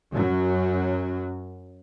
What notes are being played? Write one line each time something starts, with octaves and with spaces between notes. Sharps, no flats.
F#2 F#3